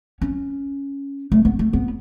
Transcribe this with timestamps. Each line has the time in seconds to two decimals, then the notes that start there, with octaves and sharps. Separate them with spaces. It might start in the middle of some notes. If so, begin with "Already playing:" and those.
0.21 C#4
1.32 A3
1.45 B3
1.59 A3
1.73 B3